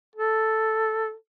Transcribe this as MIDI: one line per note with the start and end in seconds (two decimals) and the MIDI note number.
0.16 1.13 69